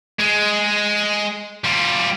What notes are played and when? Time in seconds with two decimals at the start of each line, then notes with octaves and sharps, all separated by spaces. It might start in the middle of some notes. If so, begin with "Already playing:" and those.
0.20 G#3
1.64 G3 F4